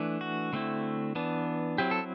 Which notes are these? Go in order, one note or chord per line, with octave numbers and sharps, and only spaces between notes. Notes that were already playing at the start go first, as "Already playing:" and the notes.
Already playing: E3 A3 D4
F#4
D3 A3 C4 E4
E3 B3 D4
F#3 C4 E4 G4
A4